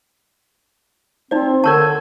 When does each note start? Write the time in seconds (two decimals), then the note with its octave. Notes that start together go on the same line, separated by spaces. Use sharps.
1.31 C4 D#4 C5 D5
1.64 D3 A#4 C#5 A5 C#6 E6 G#6